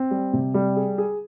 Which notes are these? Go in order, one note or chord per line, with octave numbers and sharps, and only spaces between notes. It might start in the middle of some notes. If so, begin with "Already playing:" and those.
Already playing: C4
G3
C3
G3
G#4
G#4